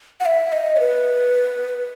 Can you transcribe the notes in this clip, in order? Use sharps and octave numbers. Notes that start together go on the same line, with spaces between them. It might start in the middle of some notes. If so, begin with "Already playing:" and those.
F#5
E5
D#5
C#5
B4